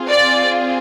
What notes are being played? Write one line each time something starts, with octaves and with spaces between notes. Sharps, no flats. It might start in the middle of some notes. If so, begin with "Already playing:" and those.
Already playing: C4 F4 G#4
D5